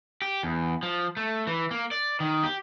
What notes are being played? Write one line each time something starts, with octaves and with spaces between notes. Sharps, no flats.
G4
E2
F3
A3
E3
A#3
D5
D#3
G4